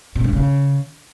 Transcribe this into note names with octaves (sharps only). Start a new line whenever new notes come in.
B2
G2
C#3